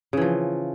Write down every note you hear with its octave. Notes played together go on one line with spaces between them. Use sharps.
C#3 E3 F3